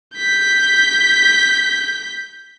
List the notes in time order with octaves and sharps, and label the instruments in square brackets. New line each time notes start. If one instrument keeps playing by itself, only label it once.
[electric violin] G6 B6